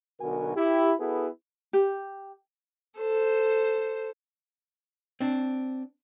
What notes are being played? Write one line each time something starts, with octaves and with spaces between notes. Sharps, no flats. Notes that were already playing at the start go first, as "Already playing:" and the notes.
B1 D3 B3 F#4 A#4 G#5
E4 G4
B3 E4 F#4 G#4 A4 B4
G4
A4 C5
C4 D4